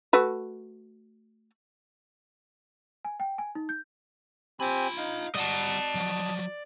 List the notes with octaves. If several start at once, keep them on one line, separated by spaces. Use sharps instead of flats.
A3 F#4 B4
G#5
G5
G#5
D#4
G6
C4 F4 G4 G#5 B5
D#4 F5
G3 D5 D#5 F#5 A5
F3 F#3